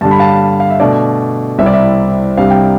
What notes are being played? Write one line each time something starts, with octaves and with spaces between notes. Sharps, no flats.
G2 D3 G3 A5
B5
F5 A5
F5
E5
B2 A3 D4 D5
C2 C3 G3 C4 E4 E5
D5
E5
C2 C3 G3 D4 F5
G5